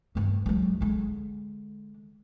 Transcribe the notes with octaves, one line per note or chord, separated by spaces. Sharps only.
G2 A3
F#3 G#3
D3 G#3